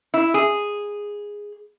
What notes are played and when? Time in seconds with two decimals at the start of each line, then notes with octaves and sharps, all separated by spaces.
0.14 E4
0.34 G#4